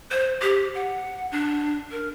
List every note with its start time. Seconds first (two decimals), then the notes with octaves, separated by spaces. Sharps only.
0.11 C5
0.42 G4
0.75 F#5
1.32 D4
1.92 A#4